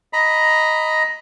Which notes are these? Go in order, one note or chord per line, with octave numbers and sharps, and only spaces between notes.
D#5 A#5 B5